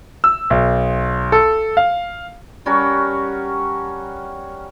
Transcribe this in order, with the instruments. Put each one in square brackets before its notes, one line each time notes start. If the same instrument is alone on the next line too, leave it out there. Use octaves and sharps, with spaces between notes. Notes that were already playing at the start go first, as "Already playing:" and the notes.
[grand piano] E6
B1
A4
F5
[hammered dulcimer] G3 C#4 F#4 A#4